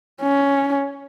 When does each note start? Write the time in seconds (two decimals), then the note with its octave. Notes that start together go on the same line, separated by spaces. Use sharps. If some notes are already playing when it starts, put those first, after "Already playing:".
0.22 C#4